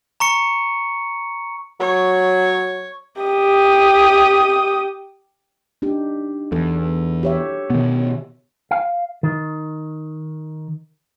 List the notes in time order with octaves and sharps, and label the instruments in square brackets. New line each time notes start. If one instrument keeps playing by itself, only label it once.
[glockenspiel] A#5 C#6 C#7
[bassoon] F#3 [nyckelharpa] C#5
[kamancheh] G4 D#6
[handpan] D4 D#4 G4
[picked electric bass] E2 [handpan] A4
[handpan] G4 C#5 E5
[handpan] B2 [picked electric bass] D#3 B3
[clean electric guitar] F5
D#3